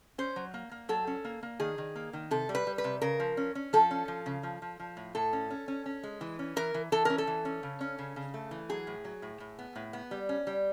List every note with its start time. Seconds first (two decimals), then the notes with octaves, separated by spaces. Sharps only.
0.18 C#4 C5
0.36 F#3
0.54 A#3
0.71 A#3
0.89 F#3 A4
1.07 C#4
1.25 A#3
1.43 A#3
1.60 D#3 G#4
1.78 D#3
1.95 A#3
2.13 D#3
2.31 C3 A4
2.49 G3
2.55 B4
2.67 G3
2.78 B4
2.84 C3
3.02 C#3 A#4
3.20 F3
3.37 C#4
3.55 C#4
3.73 F3 A4
3.91 C#4
4.08 F3
4.26 C#3
4.43 F3
4.62 F3
4.80 F3
4.97 A2
5.15 A2 A4
5.33 C#4
5.50 C#4
5.68 C#4
5.86 C#4
6.03 G#3
6.21 E3
6.39 C#4
6.56 E3 A#4
6.74 E3
6.92 E3 A4
7.05 C#4 A#4
7.18 A4
7.27 E3
7.45 C#4
7.63 C#3
7.81 C#4
7.99 C#3
8.16 C#3
8.34 A3
8.51 E3
8.69 F#3 G#4
8.87 A2
9.05 F#3
9.22 A2
9.40 A2
9.59 B3
9.76 A2
9.93 B3
10.11 G3
10.29 C#4
10.47 G3